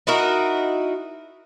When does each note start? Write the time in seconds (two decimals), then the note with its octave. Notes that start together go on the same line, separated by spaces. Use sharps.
0.07 D#4 E4 F#4 A#4